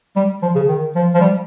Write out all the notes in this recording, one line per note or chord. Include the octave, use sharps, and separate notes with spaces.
G3
F3
C#3
D#3
F3
F3
G3